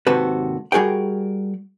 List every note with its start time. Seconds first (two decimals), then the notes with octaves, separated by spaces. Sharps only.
0.07 D#2 G#2 C3 F#4 A4 B4
0.72 G3 F#4 G#4 A#4 G5